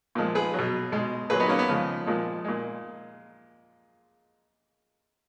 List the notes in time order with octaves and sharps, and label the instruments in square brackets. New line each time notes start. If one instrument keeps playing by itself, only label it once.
[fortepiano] A#2 F3 G#3
G#4 B4
B2 F#3
B2 G#3
A#2 F#3 G#4 B4
B3 D#4
A#3 C#4
B3
C#3 F3 G#3
A#2 F3 G#3
A#2 G#3